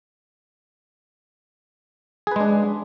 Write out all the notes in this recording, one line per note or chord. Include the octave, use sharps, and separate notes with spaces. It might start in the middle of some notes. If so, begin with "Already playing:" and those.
G#3 D4 G#4 B4